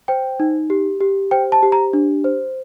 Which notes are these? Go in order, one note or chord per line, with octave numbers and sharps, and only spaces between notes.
C5 G5
D#4
G4
G4
C5 G5
A5
G4
A#5
D4
C5